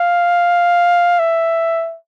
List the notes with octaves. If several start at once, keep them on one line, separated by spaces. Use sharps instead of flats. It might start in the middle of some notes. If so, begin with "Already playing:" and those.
Already playing: F5
E5